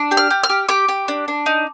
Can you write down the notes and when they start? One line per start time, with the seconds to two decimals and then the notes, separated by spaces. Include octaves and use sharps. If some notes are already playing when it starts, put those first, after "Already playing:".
Already playing: D4
0.11 G4
0.17 F6
0.31 G4
0.43 F6
0.50 G4
0.69 G4 D6
0.89 G4
1.08 D4
1.28 D4
1.46 D#4